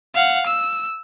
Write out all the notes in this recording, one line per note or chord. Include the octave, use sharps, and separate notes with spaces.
F5 F#5
E6